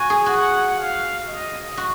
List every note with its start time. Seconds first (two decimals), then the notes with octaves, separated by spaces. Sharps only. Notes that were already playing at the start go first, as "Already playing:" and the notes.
Already playing: F#4 G#5
0.10 G#4
0.26 F#4 F#5
0.77 F5
1.27 D#5
1.77 F#4